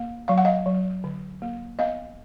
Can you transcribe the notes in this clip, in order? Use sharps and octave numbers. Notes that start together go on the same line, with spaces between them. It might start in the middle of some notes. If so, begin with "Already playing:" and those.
Already playing: A#3
F#3 F5
F#5
D#5 F5
F#3
D3
A#3
B3 D#5 F5